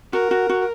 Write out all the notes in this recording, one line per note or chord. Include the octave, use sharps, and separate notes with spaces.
F#4 A#4
F#4
F#4